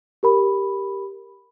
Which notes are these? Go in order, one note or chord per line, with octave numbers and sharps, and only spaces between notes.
G4 A#4 B5